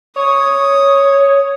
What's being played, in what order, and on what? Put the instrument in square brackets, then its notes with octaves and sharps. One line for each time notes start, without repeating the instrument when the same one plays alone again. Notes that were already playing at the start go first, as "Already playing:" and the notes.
[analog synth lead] C#5 [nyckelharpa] D#6